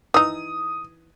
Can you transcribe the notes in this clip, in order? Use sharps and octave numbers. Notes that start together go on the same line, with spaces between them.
E3 D#4 D#6